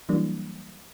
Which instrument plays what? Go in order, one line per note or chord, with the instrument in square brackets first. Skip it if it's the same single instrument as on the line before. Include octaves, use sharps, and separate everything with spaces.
[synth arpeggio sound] E3 F#3 G3 A#3 D4